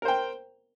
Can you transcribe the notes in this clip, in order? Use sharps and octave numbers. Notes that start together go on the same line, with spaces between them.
A#4 C5 G5